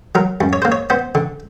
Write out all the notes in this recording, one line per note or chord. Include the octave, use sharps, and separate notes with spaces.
F#3 A#4
F#2
C#5
A#3 C5
C#5
B3 C5
D3